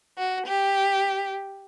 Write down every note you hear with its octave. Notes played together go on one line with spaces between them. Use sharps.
F#4
G4